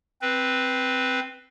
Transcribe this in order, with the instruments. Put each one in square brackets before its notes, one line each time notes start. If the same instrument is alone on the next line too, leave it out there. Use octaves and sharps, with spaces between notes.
[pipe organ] C4 B4